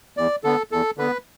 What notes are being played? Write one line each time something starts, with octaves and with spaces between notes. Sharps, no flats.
E2 D5
D3 B3 A4
E2 A4
D3 B3 B4